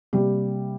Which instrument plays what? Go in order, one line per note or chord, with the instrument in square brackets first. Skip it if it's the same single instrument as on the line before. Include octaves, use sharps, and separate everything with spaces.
[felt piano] C3 G3 A#3 G4